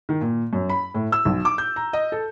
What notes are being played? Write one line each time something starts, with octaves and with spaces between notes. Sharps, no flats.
D#3
A#2
F#2
B5
A2
E6
B1
D6
G6
A#5
D#5
A4